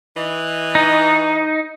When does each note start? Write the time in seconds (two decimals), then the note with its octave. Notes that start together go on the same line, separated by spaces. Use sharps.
0.17 E3 D#5
0.75 D#4